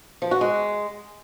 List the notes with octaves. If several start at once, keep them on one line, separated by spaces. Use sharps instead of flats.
F3
F#4
G#3